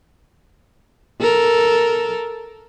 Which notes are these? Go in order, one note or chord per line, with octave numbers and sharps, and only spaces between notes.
A4 A#4